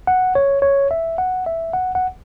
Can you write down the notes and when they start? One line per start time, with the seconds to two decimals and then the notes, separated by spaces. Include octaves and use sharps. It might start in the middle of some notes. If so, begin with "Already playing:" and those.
0.07 F#5
0.35 C#5
0.62 C#5
0.91 E5
1.18 F#5
1.46 E5
1.73 F#5
1.95 F#5